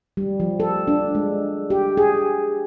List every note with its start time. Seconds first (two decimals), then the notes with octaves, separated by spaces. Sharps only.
0.17 G3
0.40 F3
0.60 A4
0.88 D4
1.15 G#3
1.70 G4
1.97 G#4